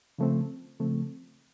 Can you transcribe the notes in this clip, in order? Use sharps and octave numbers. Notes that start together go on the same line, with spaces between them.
C#3 F3 A3 C4
C#3 F3 A3 C4